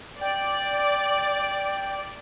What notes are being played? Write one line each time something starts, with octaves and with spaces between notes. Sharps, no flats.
D5 G5